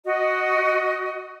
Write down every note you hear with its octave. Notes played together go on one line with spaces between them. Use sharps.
F#4 D#5